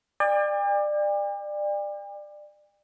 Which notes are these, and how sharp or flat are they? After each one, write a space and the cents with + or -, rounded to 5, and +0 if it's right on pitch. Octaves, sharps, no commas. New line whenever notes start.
D5 +25 G5 +45